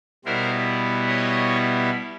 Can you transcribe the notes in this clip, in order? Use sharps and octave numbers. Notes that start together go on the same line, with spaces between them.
B2 G3 B3 E4 A#4 C5
C#5 D#5